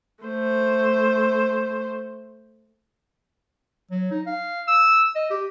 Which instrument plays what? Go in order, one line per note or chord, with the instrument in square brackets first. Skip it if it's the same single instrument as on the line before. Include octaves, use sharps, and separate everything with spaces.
[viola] A3 C5
[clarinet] F#3
D#4
F5
E6
D#5
G4